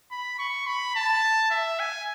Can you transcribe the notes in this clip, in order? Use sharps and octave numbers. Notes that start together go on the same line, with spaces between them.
B5
C#6
B5
A5
E5
G#5